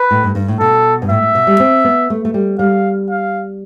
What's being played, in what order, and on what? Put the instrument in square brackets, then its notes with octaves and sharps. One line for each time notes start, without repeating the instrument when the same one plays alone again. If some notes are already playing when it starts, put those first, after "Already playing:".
Already playing: [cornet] B4
[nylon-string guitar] A2
G2
G2
A2
[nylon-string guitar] B2 [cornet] A4
[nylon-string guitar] G2
[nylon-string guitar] A2 [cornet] E5
[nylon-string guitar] A2
B2
G3
C4
B3
A3
A3
G3
[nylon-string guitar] G3 [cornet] F5
[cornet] F5